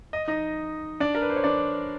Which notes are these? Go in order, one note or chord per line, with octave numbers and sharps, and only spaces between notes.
D#5
D#4 D#5
D4 D5
A#4
B4
C5
C#5
D4 D5